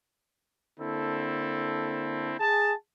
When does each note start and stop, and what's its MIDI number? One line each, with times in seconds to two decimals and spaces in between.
0.79 2.34 50
0.79 2.34 58
0.79 2.34 60
0.79 2.34 64
0.79 2.34 69
2.39 2.73 68
2.39 2.73 81